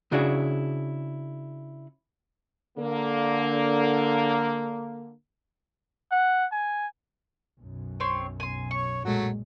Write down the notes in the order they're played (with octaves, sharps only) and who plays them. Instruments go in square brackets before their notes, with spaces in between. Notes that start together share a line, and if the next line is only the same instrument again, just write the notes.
[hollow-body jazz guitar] C#3 D4 E4 F#4 G#4
[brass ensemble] D3 A#3
[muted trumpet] F#5
G#5
[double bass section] B1 F#2 B2
[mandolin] C4 C#5 C6
G#5 C6
[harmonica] C#5 [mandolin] C#6
[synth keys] A#2 G#3 [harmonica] F#3 A3 F#4